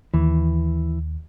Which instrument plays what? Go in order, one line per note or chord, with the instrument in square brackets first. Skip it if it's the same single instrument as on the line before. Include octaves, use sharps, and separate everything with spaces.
[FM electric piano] D#2 [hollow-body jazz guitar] E3